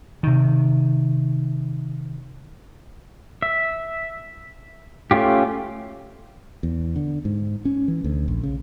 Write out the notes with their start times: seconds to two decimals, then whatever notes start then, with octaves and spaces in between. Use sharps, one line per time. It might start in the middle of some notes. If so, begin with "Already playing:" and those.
0.23 C3 D#3
3.42 E5
5.11 A3 C#4 F4 G4
6.63 E2
6.96 D3
7.25 G#2
7.65 C#4
7.88 E3
8.04 D2
8.28 A#1
8.43 C#3